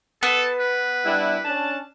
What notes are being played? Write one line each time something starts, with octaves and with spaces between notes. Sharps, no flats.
B3 A4
B4
G3 D4 E4
C#4 D4 A5